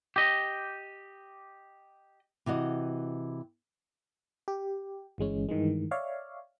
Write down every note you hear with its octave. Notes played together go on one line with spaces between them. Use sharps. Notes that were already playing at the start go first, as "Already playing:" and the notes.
G4 D#5
C3 E3 F#4 D#5
G4
G1 E3 G#3 C#4
G2 D#3 E3 G#3
C#5 D5 E5 F5